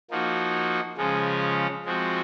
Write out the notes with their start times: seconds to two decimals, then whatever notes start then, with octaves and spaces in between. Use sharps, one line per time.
0.10 F3 A#3 D#4 F#4
0.97 C#3 F3 G#3 C#4
1.85 F3 G#3 C4 F#4